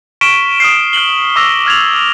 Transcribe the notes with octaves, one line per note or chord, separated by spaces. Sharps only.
C#6 F6 B6 D7 E7 G7
D#6 F6 C7
F6 C7 D7 F#7 G7
C#6 D6 E6 A#6 F7
F6 G#6 A6 F7 F#7